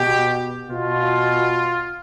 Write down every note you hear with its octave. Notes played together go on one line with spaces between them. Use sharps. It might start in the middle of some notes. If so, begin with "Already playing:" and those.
Already playing: B2 G4
B2 F4